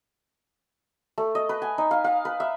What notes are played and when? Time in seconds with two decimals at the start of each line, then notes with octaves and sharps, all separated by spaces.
1.18 A3
1.35 D#5
1.49 B4
1.62 G#5
1.78 D#4
1.91 F5
2.04 F5
2.25 B4
2.40 E5